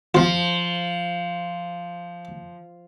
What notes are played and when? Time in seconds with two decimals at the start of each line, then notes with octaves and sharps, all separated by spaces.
0.14 F3 F4 F5